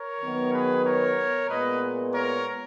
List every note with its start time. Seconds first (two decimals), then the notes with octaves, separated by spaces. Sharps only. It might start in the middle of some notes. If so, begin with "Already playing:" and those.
Already playing: A#4 C#5
0.21 D#3 F#3 B3
0.53 G#4 B4
0.85 A#4 C#5
1.49 A#2 G#3 B3 B4 D#5
2.14 A#4 C#5